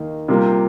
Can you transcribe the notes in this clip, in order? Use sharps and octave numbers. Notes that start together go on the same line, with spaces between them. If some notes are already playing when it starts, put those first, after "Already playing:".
Already playing: D#2 D#3 A#3
C3 G3 A#3 F4